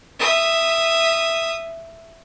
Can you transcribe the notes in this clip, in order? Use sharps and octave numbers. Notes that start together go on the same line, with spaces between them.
E5 D#6